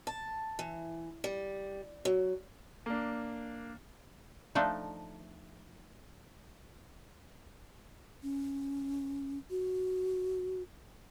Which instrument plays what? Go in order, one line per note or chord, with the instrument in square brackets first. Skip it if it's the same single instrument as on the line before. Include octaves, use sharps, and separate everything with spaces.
[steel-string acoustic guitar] A5
E3
G3
F#3
[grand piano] A#3 D4
[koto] F3 A3 D4 D#4
[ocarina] C#4
F#4